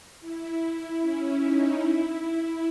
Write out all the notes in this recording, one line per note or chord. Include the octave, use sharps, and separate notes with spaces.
E4
C#4
D#4
E4